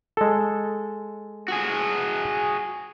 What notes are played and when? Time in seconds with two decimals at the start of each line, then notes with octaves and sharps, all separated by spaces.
0.17 G#3 A4
1.48 F#4 G#4